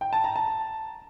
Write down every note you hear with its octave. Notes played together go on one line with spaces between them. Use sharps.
G5
A5
A#5
A5